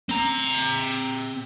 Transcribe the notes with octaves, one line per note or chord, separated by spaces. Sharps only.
C4 A#5